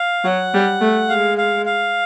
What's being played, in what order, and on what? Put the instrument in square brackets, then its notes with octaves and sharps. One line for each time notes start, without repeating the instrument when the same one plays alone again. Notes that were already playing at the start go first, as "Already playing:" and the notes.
Already playing: [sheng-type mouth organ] F5
[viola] F#3 [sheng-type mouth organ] F#5
[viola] G3
A3
[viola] G#3 [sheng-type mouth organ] F5
[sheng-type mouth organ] F5
F5